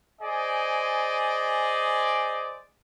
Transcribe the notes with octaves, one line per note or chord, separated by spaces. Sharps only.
G#4 C5 D5 D#5 G#5